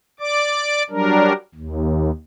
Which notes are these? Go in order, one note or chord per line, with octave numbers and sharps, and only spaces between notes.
D5 D6
F#3 G3 D4 A#4
D#2